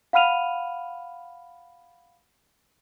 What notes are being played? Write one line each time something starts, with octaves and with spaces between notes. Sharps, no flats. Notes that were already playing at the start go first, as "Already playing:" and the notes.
F5 F#5 B5 F6 D#7 F7